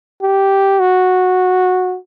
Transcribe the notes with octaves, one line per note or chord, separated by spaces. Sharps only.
G4
F#4